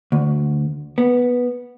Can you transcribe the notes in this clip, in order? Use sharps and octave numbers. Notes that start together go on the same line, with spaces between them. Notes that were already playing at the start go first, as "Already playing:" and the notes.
D2
B3